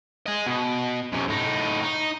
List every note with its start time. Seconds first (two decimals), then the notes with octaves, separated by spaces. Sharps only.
0.26 D#5 G#5
0.46 B2
1.12 F#2 C3
1.28 A2 D#4
1.83 D#4